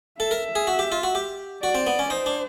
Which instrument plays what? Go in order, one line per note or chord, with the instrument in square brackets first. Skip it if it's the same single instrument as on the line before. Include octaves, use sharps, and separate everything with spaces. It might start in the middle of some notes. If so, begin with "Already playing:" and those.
[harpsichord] A4 [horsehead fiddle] E5
[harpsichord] A#4
G#4
F#4
G4
F4
F#4
G4
[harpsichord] F#4 [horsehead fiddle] D5
[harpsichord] C4
B3
C#4
[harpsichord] D#4 [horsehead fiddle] C5
[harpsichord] D4